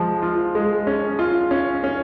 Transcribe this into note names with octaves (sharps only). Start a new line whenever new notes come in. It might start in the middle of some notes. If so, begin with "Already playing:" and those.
Already playing: F3 G#3
F4
G#3
C#4
F4
C#4
C#4